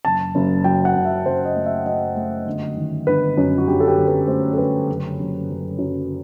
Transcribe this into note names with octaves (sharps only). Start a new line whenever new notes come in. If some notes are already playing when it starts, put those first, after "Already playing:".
F#1 A5
F#1
F#3 G5
F#5
F#1
E5
F#1 C5
D#5
A3
E5
F#2 D#5
A3
G1
D#3
G1 B4
F#2
F#4
G1 G4
A4
G4
G1
B4
A3 C5
A4
G1 B4
F#1
F#1
F#1
F#2